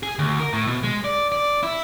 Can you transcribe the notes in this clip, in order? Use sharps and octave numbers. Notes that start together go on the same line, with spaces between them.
G#4
D2
A#4
A2
B2
G#3
D5
D5
E4